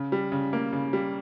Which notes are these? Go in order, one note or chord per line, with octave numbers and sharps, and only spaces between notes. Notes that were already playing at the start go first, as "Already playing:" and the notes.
Already playing: C#3
G3
C#3
A#3
C#3
G3